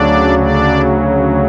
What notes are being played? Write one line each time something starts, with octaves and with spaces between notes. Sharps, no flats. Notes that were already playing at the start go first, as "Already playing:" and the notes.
Already playing: D2 C#3 F#3 D4 D5
D4 D5